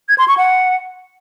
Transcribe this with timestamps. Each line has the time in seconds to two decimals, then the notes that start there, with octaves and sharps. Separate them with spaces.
0.09 G#6
0.18 C6
0.28 C#6
0.38 F#5